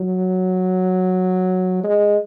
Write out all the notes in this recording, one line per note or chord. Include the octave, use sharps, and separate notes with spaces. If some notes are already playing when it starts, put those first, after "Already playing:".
Already playing: F#3
G#3